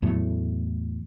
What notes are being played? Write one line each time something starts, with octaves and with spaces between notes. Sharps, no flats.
E2 A2 F#3 A3